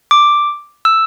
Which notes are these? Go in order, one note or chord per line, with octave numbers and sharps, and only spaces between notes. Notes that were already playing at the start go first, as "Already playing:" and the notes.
D6
E6